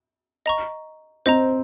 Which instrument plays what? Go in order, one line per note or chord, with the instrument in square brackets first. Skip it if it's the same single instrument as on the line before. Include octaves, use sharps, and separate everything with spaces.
[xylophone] D#5 A#5 C#6
[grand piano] C4 [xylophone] C5 D#5 A#5